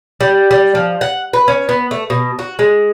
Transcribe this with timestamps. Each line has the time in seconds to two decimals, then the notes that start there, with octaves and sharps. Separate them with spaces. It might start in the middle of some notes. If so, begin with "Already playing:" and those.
0.21 G3
0.51 G3
0.75 F3
1.01 F#5
1.33 B4
1.48 C#4
1.69 B3
1.91 A3
2.10 B2
2.39 F#4
2.59 G#3